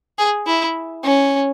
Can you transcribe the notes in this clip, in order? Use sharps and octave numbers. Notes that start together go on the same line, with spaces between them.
G#4
E4
C#4